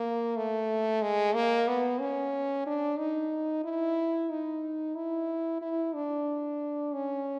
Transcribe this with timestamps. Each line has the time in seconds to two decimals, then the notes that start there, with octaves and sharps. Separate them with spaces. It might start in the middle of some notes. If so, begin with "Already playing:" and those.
Already playing: A#3
0.37 A3
1.02 G#3
1.35 A#3
1.68 B3
2.00 C#4
2.66 D4
2.99 D#4
3.65 E4
4.30 D#4
4.96 E4
5.61 E4
5.95 D4
6.93 C#4